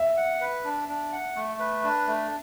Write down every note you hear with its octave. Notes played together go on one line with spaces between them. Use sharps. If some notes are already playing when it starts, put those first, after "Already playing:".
Already playing: E5
F#5
B4
D4
D4
F#5
A3
B4
D4
A3